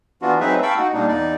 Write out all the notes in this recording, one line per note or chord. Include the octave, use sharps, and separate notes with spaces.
E3 B3 D4 F4 F#4
F#3 C4 D#4 G#4 B4 E5
F5 G5 A5 B5 C#6 E6
D#4 F#4 F#5
A#2 G3 A#3 D4 D#4
E2 D#4 D5